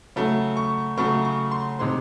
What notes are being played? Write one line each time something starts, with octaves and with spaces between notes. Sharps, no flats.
C#3 F#3 A3
C#6
C#3 F#3 A3 C#6
C#6
C6
C3 D#3 G#3 C4 C6